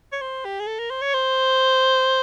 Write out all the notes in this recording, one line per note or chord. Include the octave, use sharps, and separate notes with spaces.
C#5
C5
G4
G#4
A4
A#4
C5
C#5
C5